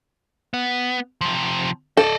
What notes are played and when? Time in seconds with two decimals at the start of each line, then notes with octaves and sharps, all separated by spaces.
0.54 B3
1.21 C3 F3
1.97 A4 D5 D#5